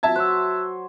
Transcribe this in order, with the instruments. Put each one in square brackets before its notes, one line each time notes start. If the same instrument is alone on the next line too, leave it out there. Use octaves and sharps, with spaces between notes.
[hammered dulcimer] F#3 [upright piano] E5 A5 G#6
[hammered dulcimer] C5 C#5 [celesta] E6 F#6